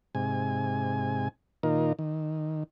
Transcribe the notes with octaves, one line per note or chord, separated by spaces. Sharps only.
G#2 C3 G#5
A#2 D#3 D#4 F4 A#4
D#3